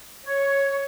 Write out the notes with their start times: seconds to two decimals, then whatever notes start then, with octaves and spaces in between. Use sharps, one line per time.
0.25 C#5